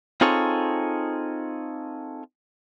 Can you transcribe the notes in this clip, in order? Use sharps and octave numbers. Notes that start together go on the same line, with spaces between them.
C4 D#4 F4 G#4 A4 C#5